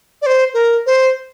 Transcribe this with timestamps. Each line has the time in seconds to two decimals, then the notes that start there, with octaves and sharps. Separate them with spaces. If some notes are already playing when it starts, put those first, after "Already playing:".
0.22 D5
0.26 C5
0.54 A#4
0.86 C5